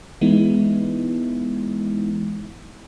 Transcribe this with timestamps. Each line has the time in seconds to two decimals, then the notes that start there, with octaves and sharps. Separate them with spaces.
0.21 E3 G#3 B3 D#4 E4